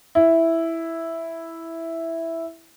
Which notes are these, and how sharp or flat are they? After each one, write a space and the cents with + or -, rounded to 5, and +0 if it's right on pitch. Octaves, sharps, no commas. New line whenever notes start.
E4 +0